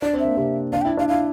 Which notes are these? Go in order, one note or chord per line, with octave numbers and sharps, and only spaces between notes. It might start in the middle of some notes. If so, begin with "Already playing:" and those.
D4 D5
C4
E5
A#3
C3 C4
D4 F5
G5
E4
D4 F5
E4 F5